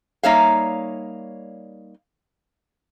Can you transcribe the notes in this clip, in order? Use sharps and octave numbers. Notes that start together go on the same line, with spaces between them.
G3 A#3 D#4 C#5 E5 F5